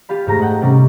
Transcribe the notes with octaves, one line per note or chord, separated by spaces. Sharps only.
F4 G4 F5 B5
G#2 A3 A#5 A#6
D#5 F#5 G5
C3 G3 C#4